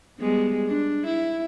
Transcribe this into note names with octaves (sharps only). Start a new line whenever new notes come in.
G3 G#3 B3
D4
E4